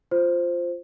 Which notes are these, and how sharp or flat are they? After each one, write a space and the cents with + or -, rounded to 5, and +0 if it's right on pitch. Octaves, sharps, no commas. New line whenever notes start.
F4 +0 C5 +0